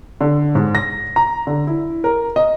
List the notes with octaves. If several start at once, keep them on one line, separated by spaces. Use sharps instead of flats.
D3
G#2
A#6
A#5
D3
E4
A#4
D#5